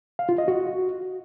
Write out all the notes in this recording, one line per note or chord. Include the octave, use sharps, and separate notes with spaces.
F5
F4
D#5
F#4